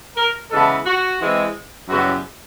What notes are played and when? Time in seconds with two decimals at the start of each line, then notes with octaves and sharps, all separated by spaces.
0.17 A#4
0.51 C#3 E3 G#3 B3 E4 A4
0.85 F#4
1.20 E3 G#3 C4
1.89 F#2 C#3 E3 G3 B3 F#4